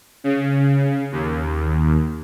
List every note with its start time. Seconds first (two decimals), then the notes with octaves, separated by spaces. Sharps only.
0.24 C#3
1.12 D#2